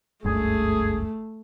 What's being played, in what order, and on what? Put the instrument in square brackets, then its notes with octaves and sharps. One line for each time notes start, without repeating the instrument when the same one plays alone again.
[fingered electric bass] F#1 C#2 G2 [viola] A3 [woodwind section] G#4